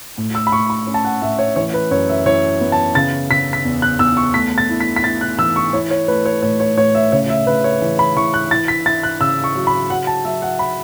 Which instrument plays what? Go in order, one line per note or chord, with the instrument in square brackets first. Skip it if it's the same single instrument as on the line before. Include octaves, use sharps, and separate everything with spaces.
[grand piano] A2
E6
B5
A2 C#6
B5
C#4
A5
F#5
A2 E5
C#5
E3 C#5
B4
F#2 C#5
E5
E3 C#5
B3
A5
C#3 A6
C#3 B6
B6
E2
F#6
E2 E6
C#6
A3 B6
A6
E4
B6
B6
E4 A6
F#6
E3 E6
C#6
E4 C#5
C#5
A3 B4
C#5
A2 C#5
C#5
A2 C#5
E5
C#3 C#5
E5
C#3 B4
C#5
E3
B5
E3 C#6
F#6
E4 A6
B6
E4 A6
F#6
C#3 E6
C#6
F#3
B5
F#3 F#5
A5
F#3 E5
F#5
B5